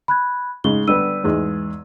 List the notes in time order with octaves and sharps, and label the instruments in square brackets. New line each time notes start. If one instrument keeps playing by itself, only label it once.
[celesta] B5 F#6 G#6
[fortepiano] G#2 C#3 G#3 [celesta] G7
[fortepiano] D3 G3 B3 [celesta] E6 D#7
[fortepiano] E2 G#2 G#3